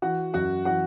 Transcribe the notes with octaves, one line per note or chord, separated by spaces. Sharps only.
E3 F#4 F#5
F#2 F#4 F#5
E3 F#4 F#5